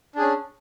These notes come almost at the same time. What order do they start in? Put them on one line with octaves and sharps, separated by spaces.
D4 G#4 C#4